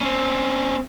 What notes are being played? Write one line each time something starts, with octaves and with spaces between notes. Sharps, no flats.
C4 C#4